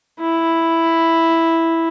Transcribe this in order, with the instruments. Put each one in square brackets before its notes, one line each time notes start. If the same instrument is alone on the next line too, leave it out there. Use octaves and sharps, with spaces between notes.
[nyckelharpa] E4